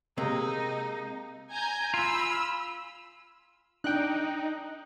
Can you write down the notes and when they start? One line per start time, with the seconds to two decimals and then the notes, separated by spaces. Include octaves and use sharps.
0.18 C3 G#3 A#3 D#4
1.52 G#5 A#5 G6
1.94 F4 B5 E6
3.84 D4 D#4 G5 F#6